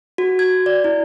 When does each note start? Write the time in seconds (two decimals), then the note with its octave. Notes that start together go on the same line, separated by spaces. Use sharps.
0.18 F#4
0.39 G#6
0.66 D5
0.84 E4